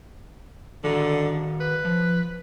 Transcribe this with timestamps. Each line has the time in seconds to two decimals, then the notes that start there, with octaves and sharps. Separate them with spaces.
0.84 D3 D#3 F#4 G#4
1.60 B4
1.85 F3